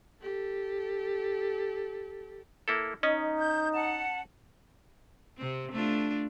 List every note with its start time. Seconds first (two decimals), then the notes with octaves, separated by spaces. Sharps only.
0.22 G4 A4
2.68 A#3 E4 A4
3.03 C#4 D#4 D#5
3.39 G6
3.73 F#5 A5
5.37 C3 C4
5.72 A3 D4 F4